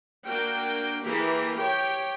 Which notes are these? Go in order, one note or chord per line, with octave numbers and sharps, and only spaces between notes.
A#3 D4 F#4 G5
E3 A#3 G4 G#4
G4 C#5 G5